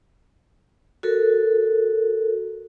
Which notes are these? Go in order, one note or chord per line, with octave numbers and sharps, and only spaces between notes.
F#4 A4 A#4